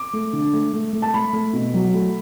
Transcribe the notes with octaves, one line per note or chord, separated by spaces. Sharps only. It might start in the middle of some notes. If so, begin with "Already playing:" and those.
Already playing: D6
A3
D3
A3
A3
A3
A5
A3 B5
A3
B2
F#3
A3